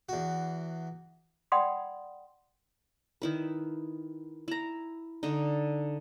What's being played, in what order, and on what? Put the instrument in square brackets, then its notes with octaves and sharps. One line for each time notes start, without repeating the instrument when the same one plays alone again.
[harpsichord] E2 F#4
[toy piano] D5 F#5 G5 B5 C6 D#6
[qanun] D#3 E4 B4
E4 A#5
D3 D#4